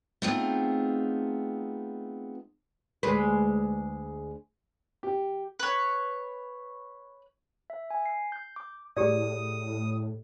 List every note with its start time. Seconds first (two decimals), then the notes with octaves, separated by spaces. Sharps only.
0.22 A3 B3 C4 D#4 F4 G#4
3.03 D2 G#3 B4
5.03 G4
5.59 B4 C#5
7.70 E5
7.90 G#5
8.06 C7
8.32 G6
8.56 D6
8.97 A2 G4 G#4 D5 D#6